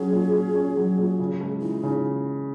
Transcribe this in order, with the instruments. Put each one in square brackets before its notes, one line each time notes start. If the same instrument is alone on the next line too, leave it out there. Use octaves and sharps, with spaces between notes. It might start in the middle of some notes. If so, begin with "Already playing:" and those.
Already playing: [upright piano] F#3 C#4 [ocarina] G#4
[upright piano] A#2
A#2
C#4
F#3
A#2
C#3
G#3
[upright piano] E3 [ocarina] D#4
[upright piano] C#3